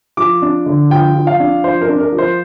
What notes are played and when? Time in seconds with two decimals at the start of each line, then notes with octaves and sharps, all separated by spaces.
0.17 F3 D6
0.42 D4
0.66 D3
0.90 F3 G5
1.15 F3
1.27 F5
1.40 D4
1.64 F3 C5
1.81 A#4
1.89 D4
2.00 A#4
2.12 F3
2.18 C5